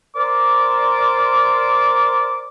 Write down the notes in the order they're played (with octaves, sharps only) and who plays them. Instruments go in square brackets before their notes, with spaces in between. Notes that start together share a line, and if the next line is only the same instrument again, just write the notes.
[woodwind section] A#4 C5 D5 D6